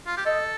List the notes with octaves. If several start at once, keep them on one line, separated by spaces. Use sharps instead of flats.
F4
G4
A4 D#5